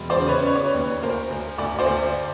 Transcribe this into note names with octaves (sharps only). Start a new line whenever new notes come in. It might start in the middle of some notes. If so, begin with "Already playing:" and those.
Already playing: E1
C5 D5
C#3
B4 C#5
C#3 C#5
D5
B4 C#5
D#2
D2 A#4 C5
D2
D2 D5
C5 D5
D2